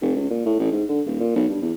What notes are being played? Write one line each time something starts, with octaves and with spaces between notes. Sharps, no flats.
F1
C#2
A#2
A2
A1
G#2
D3
D#1
A#2
B1
G2
E2